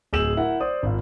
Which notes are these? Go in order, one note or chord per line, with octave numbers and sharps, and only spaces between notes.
D1 G#4 E6 G6 E7 F#7
E4 A#4 F#5
C5 D5 D#6
G#1 F4